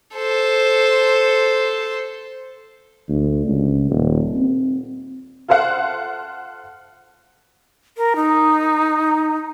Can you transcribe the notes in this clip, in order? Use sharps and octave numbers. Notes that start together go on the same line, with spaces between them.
A4 C5
D2
C#2
D#1
C4
F4 A4 C5 F5 F#5
A#4
D#4